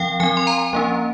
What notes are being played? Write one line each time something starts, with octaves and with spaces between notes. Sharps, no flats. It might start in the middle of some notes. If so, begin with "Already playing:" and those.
Already playing: F3 C4 F5 G5
F3 C4 G#5
C6
A#5
F3 A#3 C#4